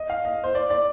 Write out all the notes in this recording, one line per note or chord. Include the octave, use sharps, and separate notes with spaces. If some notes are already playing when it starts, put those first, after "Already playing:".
Already playing: D#5
F5
D#5
C5
D5
D5